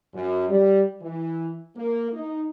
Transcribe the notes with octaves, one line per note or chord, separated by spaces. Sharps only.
F#2
G3
E3
A#3
D#4